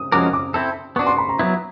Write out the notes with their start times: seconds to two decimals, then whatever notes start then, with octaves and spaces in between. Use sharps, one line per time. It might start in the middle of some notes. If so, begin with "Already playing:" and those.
Already playing: D#6
0.12 F3 G#3 C#4 F#4 A#4 D6
0.33 D6
0.54 C4 E4 A4
0.96 B3 D4 F#4 C#6
1.07 C6
1.18 B5
1.29 A#5
1.39 F#3 B3 E4